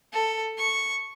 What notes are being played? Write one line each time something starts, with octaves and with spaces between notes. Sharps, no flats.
A4
C#6